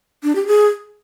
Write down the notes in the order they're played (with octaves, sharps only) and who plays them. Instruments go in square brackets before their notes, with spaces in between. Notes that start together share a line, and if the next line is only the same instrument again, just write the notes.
[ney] D4
G4
G#4